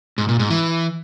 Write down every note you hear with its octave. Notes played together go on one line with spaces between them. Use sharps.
G#2
A#2
G#2
E3